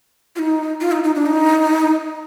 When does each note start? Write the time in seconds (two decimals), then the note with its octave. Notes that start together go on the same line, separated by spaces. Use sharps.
0.36 F4
0.39 D#4
0.81 F4
0.92 D#4
1.04 D#4
1.15 D4
1.26 D#4